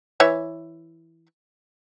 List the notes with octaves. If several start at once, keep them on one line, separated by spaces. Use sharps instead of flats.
E3 C#5 E5